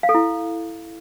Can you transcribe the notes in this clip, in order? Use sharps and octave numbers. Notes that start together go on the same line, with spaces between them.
F5
A4
E4